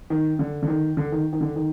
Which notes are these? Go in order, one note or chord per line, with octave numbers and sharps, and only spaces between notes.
D#3
D3
D3
D#3
D3
D#3
D#3
D3
D#3